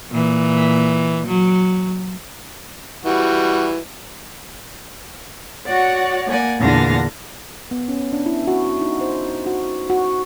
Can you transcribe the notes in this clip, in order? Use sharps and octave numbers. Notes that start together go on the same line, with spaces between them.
A#2 E3
F#3
E3 G3 F#4
F#4 C#5 D5 F#5
A#3 D5 F#5 G#5
E2 A#2 D3 D4 F5 A#6
B3
C#4
D4
E4
F#4
D#4
C5
F#4
F#4